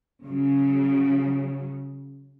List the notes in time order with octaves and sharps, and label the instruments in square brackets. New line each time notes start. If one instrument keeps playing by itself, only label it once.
[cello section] C#3 F#3